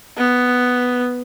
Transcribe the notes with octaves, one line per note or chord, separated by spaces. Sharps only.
B3